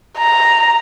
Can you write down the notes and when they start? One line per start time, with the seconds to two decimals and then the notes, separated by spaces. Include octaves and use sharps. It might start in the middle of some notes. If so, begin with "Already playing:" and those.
0.18 A#5